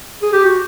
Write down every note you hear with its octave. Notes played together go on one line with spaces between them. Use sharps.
G#4
G4
F#4